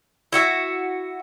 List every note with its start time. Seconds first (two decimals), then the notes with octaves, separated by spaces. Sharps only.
0.33 E4 F#4 E5